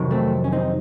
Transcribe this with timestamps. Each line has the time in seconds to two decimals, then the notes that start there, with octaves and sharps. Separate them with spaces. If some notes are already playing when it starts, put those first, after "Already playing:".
Already playing: F2 C3 D#3 F#3
0.11 A3 C4
0.44 C#4
0.52 C4 D#4